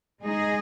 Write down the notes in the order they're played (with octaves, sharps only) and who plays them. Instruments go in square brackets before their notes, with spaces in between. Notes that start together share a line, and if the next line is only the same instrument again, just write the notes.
[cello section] G#3 D#4 G#4 D#5